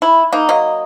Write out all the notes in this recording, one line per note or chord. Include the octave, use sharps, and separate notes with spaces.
E4
A#3 D#4
F#3 A#3 D#5